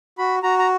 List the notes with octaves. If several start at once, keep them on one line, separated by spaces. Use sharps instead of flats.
F#4 B5
F#4 A#5
A#5